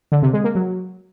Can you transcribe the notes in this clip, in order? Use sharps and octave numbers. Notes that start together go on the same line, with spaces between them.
D3
C3
G#3
A#3
F#3